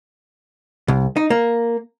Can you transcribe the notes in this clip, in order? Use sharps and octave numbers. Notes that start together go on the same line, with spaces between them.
C2
D#4
A#3